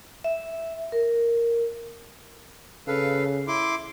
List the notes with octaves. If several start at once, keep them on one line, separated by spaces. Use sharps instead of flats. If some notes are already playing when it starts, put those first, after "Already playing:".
E5
A#4
C#3 A4 B4 F5
E4 C6 D6